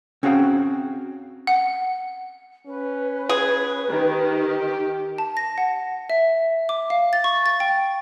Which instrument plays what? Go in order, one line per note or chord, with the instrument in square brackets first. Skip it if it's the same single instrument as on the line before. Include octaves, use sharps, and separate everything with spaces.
[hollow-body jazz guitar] C4 C#4 F#4 G#4 F5 G5
[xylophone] F#5
[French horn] C#4 [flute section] B4
[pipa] G#4
[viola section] D#3 [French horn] G4
[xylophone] A5
A#6
F#5
E5
D6
F5
A6
C#6
A6
G5